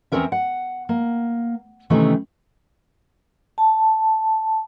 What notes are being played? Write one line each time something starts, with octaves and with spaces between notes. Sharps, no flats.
E2 F#3 C4 C#4 A#4 E5
F#5
A#3
C3 D#3 E3 A3 C4 C#4
A5